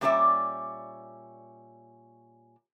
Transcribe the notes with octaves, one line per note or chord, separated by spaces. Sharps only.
A#2 G3 C#4 G4 D5 E5